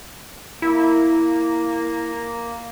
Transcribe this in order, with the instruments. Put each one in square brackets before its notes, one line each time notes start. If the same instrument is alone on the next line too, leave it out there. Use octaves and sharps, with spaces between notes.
[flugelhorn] A#3 [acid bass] E4